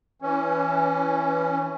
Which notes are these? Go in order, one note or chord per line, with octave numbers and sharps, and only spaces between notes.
E3 C#4